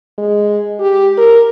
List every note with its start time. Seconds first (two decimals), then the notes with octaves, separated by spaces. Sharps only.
0.18 G#3
0.80 G4
1.17 A#4